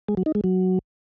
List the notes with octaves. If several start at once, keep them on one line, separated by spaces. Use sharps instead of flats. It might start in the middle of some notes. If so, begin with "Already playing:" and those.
G#3
F#3
D#4
G#3
F#3